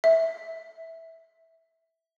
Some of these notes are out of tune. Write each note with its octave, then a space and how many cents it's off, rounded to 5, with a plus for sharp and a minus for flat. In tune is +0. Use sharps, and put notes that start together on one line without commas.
E5 -10